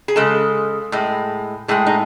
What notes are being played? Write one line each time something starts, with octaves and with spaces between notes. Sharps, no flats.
G#4
C#3 G#3 A4
A2 G#3
A2 G#3 G#4
D#4